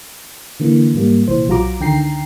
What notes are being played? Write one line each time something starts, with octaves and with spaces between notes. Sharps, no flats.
D3 E3 A#3
G#2 G3 A#3
C2 A#2 E3 C5
B1 F#3 F4 F#4 A#5 D6
C#2 D3 D#3 G5 A#5 C7